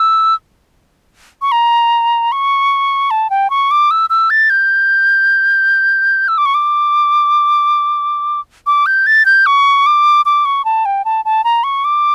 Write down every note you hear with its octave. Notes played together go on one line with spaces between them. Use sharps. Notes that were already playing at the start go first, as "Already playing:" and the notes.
Already playing: E6
C#6
A#5
C#6
A5
G5
C#6
D6
E6
E6
A6
G6
E6
D6
C#6
D6
D6
G6
A6
G6
C#6
D6
D6
C#6
A5
G5
A5
A5
A#5
C#6
D6